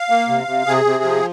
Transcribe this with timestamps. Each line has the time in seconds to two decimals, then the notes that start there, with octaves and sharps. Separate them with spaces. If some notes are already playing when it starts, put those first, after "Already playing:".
Already playing: F5
0.10 A#3
0.28 C3
0.47 C3
0.66 C3 G#4
0.85 C3
1.04 F3